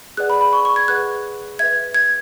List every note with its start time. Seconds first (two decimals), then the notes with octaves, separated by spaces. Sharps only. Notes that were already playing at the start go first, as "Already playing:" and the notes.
0.17 G#4 B4 D5 F#5 F#6
0.30 B5
0.41 B5
0.53 C#6
0.65 C#6
0.76 G#6
0.88 G#4 B4 F#5 F#6
1.59 B4 E5 G#6
1.94 G#6